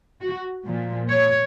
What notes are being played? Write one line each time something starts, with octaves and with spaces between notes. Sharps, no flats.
F#4
A#2 F3
C#5